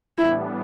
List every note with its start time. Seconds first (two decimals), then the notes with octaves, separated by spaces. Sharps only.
0.18 A2 E3 G3 B3 D4 E4